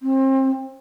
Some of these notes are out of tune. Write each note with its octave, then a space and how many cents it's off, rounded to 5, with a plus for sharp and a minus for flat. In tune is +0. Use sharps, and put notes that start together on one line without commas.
C4 +30